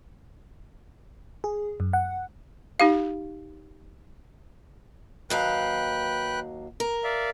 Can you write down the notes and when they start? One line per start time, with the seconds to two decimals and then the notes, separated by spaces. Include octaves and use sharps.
1.44 G#4
1.80 F#2
1.93 F#5
2.80 D#4 G4 F5
5.30 D#2 F#3 B4 F5 G5 F#6
6.80 A#4
7.04 D5 E5 F5